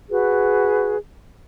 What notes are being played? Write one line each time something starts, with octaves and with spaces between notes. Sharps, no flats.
F#4 G#4 B4